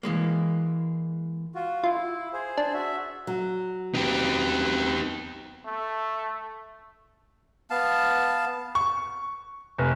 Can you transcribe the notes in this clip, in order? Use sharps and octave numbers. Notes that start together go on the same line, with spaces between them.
E3 G#3 A#3
F4 F#4
E4 F4
G#4 C5
D4
F#4 E5
F#3
B3 C4 D#4 G4
A3
B3 F5 A5
C#6
F1